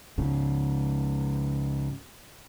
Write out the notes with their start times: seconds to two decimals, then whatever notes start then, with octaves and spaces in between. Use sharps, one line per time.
0.18 C#2 G#2 C#3